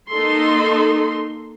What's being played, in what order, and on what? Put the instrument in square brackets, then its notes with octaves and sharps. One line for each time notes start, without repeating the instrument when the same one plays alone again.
[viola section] A#3 D#4 A4 C6